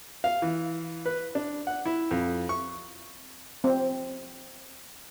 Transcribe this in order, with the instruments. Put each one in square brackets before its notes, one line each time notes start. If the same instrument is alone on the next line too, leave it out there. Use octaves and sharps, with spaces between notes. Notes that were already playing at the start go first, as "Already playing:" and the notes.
[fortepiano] F5
E3
B4
D4
F#5
E4
F2
C#6
[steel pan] C4